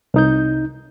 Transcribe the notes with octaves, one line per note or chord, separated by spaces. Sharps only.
C2 D#4 G6